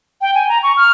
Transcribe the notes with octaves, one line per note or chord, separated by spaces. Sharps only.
G5
G#5
A#5
C#6
F6